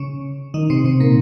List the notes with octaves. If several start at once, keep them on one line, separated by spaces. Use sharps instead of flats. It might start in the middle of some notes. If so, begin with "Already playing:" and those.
Already playing: C#3 C#4
D#3 D#4
C3 C4
C3 C4
A#2 A#3